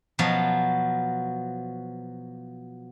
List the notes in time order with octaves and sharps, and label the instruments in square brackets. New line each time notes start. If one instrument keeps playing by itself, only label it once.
[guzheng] B2 F3 F#3